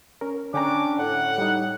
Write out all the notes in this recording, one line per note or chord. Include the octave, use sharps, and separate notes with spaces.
C#4 A#4
D3 C#4 D4 G5 A#5 D6
A2 F#5
G3 D#4